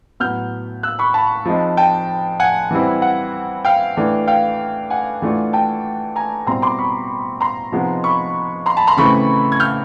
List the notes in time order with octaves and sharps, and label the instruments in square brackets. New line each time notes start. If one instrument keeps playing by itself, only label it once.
[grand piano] A2 F#3 B3 F6 G6
E6 F#6
B5 C#6
A5 B5
F3 G#3 C4 D#4
G5 A5
F#5 G#5
E3 G3 C4 E4
F#5
F5 G5
E3 A3 D4
F5 G5
F#5 G#5
E3 A3 D4 F4
G5 A5
G#5 A#5
B2 G3 C4 E4 A#5 C6
C6 D6
B5 C#6
A#5 C6
C3 F3 G#3 B3 D#4
B5 C#6
A#5 C6
A5 B5
A#5 C6
C#3 E3 A3 C4 B5 C#6
G#6
F6 G6